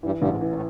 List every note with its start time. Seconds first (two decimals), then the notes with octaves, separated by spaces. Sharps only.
0.03 G2 E3
0.19 A1 G2
0.28 G#2
0.41 E3
0.49 A#2
0.54 A2